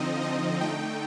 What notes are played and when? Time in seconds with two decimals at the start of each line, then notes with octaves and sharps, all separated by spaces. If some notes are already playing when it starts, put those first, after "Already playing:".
Already playing: D3 F3 C4 D#4 D#5
0.22 D#5
0.61 D3 A3 D#4 G5